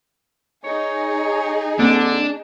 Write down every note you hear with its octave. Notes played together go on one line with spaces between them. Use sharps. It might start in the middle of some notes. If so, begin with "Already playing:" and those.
D#4 G#4 C#5
D3 A#3 C4 D4